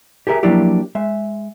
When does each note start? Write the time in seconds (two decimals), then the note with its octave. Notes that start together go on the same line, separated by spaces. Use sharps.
0.27 G4 G#4 A#4 E5
0.43 F3 F#3 A#3 D4 E4 G4
0.95 G#3 E5